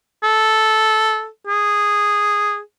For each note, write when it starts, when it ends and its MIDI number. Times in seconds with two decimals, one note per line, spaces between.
0.24 1.28 69
1.47 2.59 68